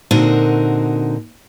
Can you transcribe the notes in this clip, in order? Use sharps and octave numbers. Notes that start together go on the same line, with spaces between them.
A#2 D3 C4 D#4 F#4 A#4